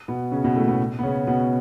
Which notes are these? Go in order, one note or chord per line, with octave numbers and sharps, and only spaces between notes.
B2 B3
C#3 C#4
B2 B3
A2 A3
B2 B3
B3
C#3 C#4
B2 B3